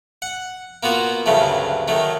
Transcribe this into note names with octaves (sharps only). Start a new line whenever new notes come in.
F#5
A#3 B3 F4 F#4
D2 G2 C#3 F#3 A3
D#3 F#3 A3